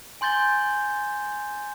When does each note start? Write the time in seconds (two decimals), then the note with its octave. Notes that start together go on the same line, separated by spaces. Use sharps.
0.21 G#5 C6 G6 A6 G7